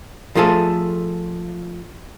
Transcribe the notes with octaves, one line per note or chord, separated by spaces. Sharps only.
F3 A3 F4 G#4 A4